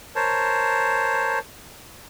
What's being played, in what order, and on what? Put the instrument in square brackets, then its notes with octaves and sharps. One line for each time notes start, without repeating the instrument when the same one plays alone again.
[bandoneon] A#4 C5 C#5 A5